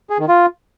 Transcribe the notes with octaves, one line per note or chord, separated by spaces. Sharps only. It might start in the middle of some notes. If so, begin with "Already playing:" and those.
G#4
D#3
F4